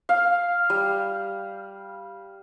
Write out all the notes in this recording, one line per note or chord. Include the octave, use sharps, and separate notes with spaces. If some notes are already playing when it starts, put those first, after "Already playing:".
F5
G3